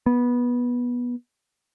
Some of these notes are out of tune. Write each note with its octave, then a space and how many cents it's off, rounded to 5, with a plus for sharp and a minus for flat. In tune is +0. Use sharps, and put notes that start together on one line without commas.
B3 -15